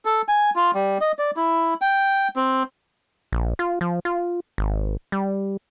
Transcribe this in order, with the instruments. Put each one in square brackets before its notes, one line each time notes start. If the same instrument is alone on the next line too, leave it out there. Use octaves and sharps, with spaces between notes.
[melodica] A4
G#5
F4
G3
D#5
D5
E4
G5
C4
[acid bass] A#1
F4
F3
F4
G#1
G3